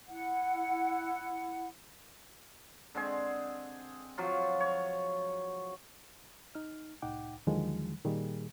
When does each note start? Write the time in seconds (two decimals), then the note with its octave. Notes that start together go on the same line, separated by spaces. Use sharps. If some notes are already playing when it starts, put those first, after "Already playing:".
0.09 E4 F#5
2.95 D3 G#3 C4 G#4
4.18 F3 F#3 F4
4.60 C#5
6.55 D#4 F6
7.02 C2 A2 D#4 F#5 G5 D6
7.47 D#2 D3 D#3 F3 F#3 G#3
8.05 A#2 D#3 G3 A#3 G#4